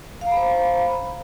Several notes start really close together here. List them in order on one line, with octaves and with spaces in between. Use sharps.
F5 A#5 B5 C5